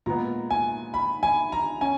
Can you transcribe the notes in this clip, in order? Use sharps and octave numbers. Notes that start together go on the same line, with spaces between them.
A#2 G#3 B3 A#5
G#5
B5
G#5
A#5
C#4 G#5